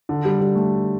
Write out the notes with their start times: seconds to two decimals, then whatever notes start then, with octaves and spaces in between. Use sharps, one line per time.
0.09 D3
0.25 G3
0.40 G3
0.55 A3